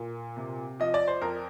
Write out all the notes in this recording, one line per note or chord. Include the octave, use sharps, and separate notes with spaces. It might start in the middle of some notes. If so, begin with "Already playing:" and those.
Already playing: A#2
C3
F3 D#5
D5
C5
F2 A#4